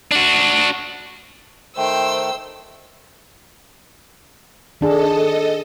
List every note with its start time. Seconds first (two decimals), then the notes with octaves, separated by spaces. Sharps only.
0.12 D4 F#4
1.77 D#3 A3 C5 G5 E6
4.81 D#3 D4 G#4 A4 D#5